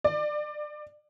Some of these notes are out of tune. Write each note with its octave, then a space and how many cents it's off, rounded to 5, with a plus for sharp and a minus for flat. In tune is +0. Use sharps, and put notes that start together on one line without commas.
D5 +25